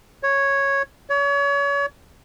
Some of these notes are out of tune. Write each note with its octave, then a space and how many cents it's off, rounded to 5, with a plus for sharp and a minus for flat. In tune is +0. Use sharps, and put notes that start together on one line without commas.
C#5 -5
C#5 +35